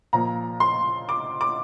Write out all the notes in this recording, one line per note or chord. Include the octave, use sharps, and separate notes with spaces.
A#2 F3 A#3 A#5
C6
D6
D6